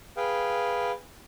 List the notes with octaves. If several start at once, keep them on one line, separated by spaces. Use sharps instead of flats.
G#4 B4 F5 G5